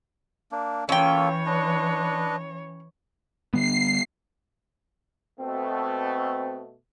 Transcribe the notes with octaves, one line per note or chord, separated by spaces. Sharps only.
A#3 D4
E3 A#3 C#4 F4 A4 C#5 G5
D4 B4 D#5
D3 G3 B3 C7
B2 A3 C4